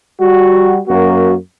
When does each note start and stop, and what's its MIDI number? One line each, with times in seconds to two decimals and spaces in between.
0.19 0.78 55
0.19 0.78 66
0.87 1.34 42
0.87 1.34 58
0.87 1.34 66